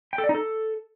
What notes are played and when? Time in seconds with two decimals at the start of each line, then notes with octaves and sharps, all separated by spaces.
0.13 G5
0.18 A4
0.24 D5
0.29 D#4
0.35 A4